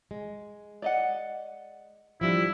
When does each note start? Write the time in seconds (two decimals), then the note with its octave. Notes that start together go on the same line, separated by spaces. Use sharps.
0.11 G#3
0.82 D5 D#5 F#5
2.21 F3 G3 D4 E4